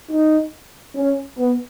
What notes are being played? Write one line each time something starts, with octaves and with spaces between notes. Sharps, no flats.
D#4
C#4
B3